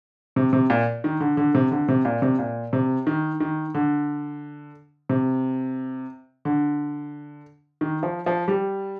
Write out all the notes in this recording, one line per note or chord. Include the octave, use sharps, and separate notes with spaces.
C3
C3
A#2
D#3
D3
D3
C3
D3
C3
A#2
C3
A#2
C3
D#3
D#3
D3
C3
D3
D#3
F3
F3
G3